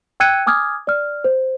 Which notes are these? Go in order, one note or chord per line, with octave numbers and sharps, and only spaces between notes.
G5 E6 F#6 G#6 C#7 D#7
G#5 D6 D#6 F6 G#6
D5 F6
C5